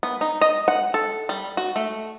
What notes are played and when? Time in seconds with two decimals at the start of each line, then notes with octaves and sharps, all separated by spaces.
0.03 B3
0.21 D#4
0.41 D#5
0.68 F#5
0.94 A4
1.29 G3
1.57 F#4
1.76 A3